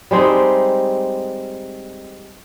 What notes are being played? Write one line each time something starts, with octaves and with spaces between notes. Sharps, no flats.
G3 G#3 C4 D#4